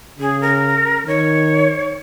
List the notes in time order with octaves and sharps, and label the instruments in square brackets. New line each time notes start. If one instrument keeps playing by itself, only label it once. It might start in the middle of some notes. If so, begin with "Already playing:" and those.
[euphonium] C#3 [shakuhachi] G#4
[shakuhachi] A#4
[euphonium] D#3 [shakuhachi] C#5